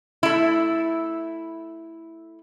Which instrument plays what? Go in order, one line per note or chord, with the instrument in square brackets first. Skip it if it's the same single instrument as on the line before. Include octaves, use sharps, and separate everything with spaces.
[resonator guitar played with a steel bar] A3 E4